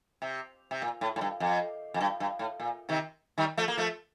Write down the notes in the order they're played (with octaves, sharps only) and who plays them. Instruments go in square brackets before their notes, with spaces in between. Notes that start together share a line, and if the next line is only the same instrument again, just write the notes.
[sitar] C3
C3
A#2
A2
A2
G2
F2
F2
G2
G2
A2
A#2
C3 D#3
D#3 G3
F3 A3
A#3
F3 A3